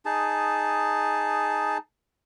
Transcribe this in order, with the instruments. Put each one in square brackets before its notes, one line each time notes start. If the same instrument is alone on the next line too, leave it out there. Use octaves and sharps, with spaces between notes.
[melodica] D#4 G#4 A5